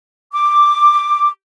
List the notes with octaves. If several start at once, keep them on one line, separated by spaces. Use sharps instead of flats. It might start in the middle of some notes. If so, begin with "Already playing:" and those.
D6